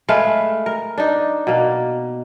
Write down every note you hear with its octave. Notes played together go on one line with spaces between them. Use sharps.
G#3 A3 B4 F5
A#4
D4 D#4
B2 A#3